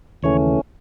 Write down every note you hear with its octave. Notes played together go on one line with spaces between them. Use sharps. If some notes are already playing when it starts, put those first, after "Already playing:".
D#2 C#3 E3 A3 C#4 C#5